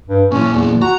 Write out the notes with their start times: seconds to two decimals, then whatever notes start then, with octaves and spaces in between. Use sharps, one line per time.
0.09 G2
0.32 A#2 E3 C#4
0.54 E2
0.82 F#4 A#5